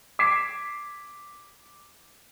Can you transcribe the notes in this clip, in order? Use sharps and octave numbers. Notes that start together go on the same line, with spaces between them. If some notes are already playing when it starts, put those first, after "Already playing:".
D6 G#6 B6 C7 E7